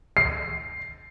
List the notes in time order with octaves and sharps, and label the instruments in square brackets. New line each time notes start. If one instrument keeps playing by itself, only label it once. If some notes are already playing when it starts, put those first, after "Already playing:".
[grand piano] C7